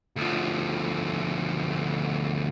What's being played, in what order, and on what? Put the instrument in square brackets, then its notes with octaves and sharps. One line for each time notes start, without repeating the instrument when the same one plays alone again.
[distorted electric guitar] D2 F3